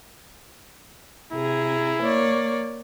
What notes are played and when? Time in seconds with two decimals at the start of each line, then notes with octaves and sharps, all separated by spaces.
1.33 C3 E4 G#4 A#5
2.01 A#3 C#5 D5